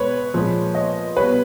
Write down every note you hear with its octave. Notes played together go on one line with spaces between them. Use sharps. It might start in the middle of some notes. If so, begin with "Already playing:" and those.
Already playing: B2 G#3 B4 C#5
A#2 F3 G#3
C#5 D#5
B2 G3 B4 C#5